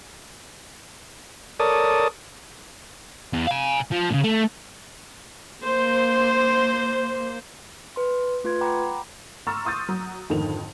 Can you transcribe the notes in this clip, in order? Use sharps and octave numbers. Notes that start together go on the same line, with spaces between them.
A4 A#4 C#5 D5 A5 D#6
E2
F5 G#5
F3
A#2 C#3
A3
A#3 C5
B4 C6
A3 F4 B4 C6 G#6
F#5 G5 A#5 B5 D6
A#5 C6 C#6 E6 F6 A6
C6 C#6 D#6 E6 G6 A6
F#3
G#1 F2 D3 D#3 F7